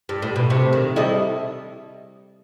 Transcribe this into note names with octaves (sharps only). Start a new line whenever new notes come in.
G2
A2
B2
C3 A3
D#3
G3 E4 A4 D#5